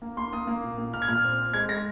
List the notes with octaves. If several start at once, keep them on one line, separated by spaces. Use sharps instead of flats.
A#3
A#3 C6
A#3 D#6
A#3
A#2
A#3
A#2 F6
G#6
A#2 F6
C4
C4
G#3 G#6
G#3 A#6